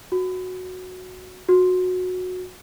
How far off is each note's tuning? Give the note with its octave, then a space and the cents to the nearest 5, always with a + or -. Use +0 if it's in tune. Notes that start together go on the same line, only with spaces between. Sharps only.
F#4 -5
F#4 -15